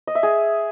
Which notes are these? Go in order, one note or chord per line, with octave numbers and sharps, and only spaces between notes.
D#5
E5
G#4